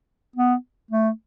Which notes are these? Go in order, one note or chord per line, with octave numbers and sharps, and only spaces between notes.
B3
A3